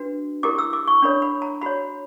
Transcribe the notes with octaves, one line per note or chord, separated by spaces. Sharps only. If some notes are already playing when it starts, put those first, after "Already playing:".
Already playing: D4 F#4 B4
E4 G4 A#4 D6
E6
D6
C#6
D4 A#4 C#5 B5
B5
A#5
F#4 C#5 B5